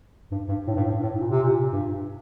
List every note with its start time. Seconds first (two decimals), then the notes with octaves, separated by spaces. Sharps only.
0.31 G2
0.48 G2
0.67 A2
0.76 G2
0.84 A2
0.94 G2
1.02 A2
1.20 A#2
1.31 C3
1.43 A#2
1.72 G2